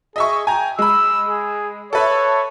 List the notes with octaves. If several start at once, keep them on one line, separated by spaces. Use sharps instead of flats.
G#4 D#5 E5 C#6
G5 G#5 A#5
G#3 B5 E6
G#4
A4 B4 C#5 E5